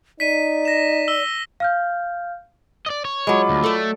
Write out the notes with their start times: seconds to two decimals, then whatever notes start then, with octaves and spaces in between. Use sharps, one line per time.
0.20 D#4 D5 B6 D#7
0.65 A#6 E7
1.08 E6 G7
1.60 F5 F6 G6
2.86 D5 D#5
3.05 C#5
3.27 F#3 G#3 F4 B5 D6
3.49 D2
3.64 A3 A4 D5